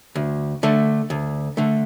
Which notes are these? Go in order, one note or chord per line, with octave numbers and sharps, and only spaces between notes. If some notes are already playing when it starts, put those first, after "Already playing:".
D2
D3 A3
D2
D3 A3